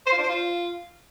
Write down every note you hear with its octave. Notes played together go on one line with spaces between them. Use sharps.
C5
F4
D4
C5
F4